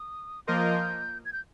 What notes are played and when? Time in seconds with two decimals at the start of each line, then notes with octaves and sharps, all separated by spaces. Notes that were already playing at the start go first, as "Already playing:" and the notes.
Already playing: D#6
0.47 F3 A#3 F4 A#4 D#5 G6
1.25 G#6
1.33 G6